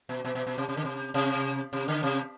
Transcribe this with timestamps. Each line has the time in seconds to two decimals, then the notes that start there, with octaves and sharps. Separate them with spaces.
0.09 B2
0.25 B2
0.35 B2
0.47 B2
0.58 C3
0.69 C3
0.77 D3
0.85 C3
1.14 C3
1.73 C3
1.88 D3
2.03 C3